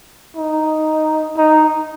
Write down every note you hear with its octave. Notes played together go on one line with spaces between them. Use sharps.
D#4
D#4